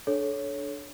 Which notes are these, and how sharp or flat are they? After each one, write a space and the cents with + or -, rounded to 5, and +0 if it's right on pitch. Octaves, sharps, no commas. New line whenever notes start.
D4 +0 A4 -30 C#5 +0